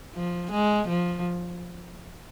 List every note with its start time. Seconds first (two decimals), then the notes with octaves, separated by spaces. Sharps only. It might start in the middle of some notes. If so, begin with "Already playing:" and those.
0.15 F3
0.51 G#3
0.88 F3